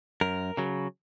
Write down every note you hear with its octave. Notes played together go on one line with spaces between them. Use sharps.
F#2 A#4
C#3 F#3